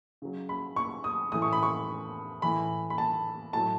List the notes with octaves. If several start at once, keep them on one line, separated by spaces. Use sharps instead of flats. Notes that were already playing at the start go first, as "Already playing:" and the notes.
C#3 F#3
B5
C#6
D#6
A2 E3 D#6
C#6
B5
C#6
A2 E3 B5
B5
A5
A2 F#3 A5